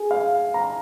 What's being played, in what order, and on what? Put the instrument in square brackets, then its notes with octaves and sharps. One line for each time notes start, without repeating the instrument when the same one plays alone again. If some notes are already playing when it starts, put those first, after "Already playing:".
Already playing: [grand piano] G#4
F5
A#5